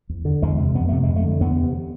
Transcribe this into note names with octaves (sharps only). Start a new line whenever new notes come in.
E2
D3
E2 G#3
C3
F2 B3
C3 A3
F2 G#3
A3
D3
E2 B3
C3